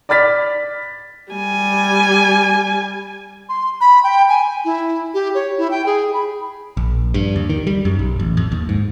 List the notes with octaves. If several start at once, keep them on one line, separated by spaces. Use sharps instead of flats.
D5 B5 F6 A6 B6
G3 G#5
C6
B5
G5
G#5
E4
G4
C#5
E4
G5
G#4
B5
A#1
G2
D#2
D#3
G3
F#2
B1
A1
F2
D#2
G#2